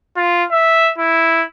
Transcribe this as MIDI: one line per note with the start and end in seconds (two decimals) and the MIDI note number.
0.16 0.44 65
0.51 0.91 76
0.98 1.45 64